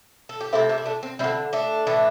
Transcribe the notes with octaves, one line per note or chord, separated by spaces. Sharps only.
A4
G4
C3 A3 C4 E4
A3 D4
E4
A3 D4
C4
D3 G3 C4 E4
A3 D4
A2 E3 A3